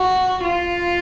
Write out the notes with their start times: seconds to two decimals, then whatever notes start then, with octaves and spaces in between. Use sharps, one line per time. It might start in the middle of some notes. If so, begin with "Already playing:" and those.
Already playing: F#4
0.44 F4